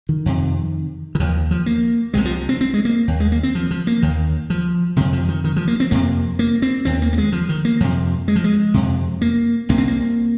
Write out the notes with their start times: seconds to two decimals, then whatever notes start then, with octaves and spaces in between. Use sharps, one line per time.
0.09 D#3
0.26 F2 C3
1.15 D#3
1.20 D#2 F3
1.51 F3
1.66 A#3
2.14 C2 C3 G#3
2.25 F3
2.49 C4
2.61 C4
2.74 G#3
2.85 A#3
3.08 D#2
3.20 G#3
3.32 A#3
3.43 C4
3.55 F3
3.71 F3
3.87 A#3
4.02 D#2 D#3
4.50 F3
4.96 F2 C3 D#3
5.13 F3
5.29 D#3
5.44 D#3
5.56 F3
5.68 A#3
5.80 C4
5.91 F2 C3 A#3
6.39 A#3
6.62 C4
6.85 D#2 C4
7.02 A#3
7.13 A#3
7.18 G#3
7.32 F3
7.49 D#3
7.65 A#3
7.80 F2 C3 F3
8.28 G#3
8.36 F3
8.44 G#3
8.74 F2 C3
9.22 A#3
9.69 C2 C3 A#3
9.78 C4
9.88 A#3